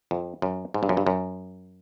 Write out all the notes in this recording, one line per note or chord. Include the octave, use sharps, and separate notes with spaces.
F2
F#2
G#2
G2
F#2
G2
F#2